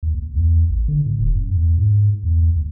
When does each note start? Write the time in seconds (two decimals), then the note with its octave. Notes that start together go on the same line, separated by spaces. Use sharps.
0.03 D#2
0.14 C#2
0.35 E2
0.70 A1
0.88 D3
1.06 A2
1.20 D#1
1.35 F#2
1.54 E2
1.78 G#2
2.23 E2
2.56 D2